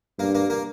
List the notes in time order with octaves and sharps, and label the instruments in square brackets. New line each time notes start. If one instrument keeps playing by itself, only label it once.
[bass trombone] G2 [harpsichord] A#3
[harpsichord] A#3
A#3